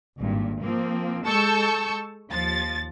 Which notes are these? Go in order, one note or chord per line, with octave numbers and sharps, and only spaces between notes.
G#1 G2 A#2
F3 A#3 C4
G#3 A4 A5 C#6 E6 G6
D#2 F3 A6